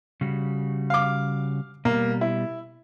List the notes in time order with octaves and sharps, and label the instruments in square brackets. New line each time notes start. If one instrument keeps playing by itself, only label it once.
[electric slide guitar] C#3 G3 F#4
[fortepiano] F5 D6
[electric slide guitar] B2 G3 [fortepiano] A#3
[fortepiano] E4